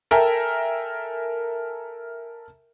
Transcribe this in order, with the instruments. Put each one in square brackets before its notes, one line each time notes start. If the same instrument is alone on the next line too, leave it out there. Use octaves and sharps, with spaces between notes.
[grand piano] A4 A#4 E5 G5 G#5 A#5